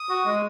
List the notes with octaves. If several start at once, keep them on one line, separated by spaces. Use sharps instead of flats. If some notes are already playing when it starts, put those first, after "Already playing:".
Already playing: D#6
F#4
G#3